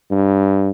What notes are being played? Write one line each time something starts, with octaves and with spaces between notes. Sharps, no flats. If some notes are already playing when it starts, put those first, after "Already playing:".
G2